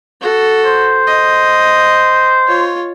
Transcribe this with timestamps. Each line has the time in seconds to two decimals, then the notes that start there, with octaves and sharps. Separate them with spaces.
0.21 F#4 A4
0.66 C5
1.07 D#5
2.47 F4 C#5